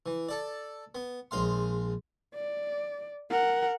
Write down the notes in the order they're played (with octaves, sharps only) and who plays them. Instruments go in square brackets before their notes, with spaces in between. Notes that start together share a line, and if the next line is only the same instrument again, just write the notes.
[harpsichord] E3
A4 D5
B3
A#1 G#3 F5 C6
[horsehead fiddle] D5
A#4 F#5